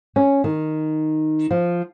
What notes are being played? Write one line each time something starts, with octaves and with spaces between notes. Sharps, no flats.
C#4
D#3
F3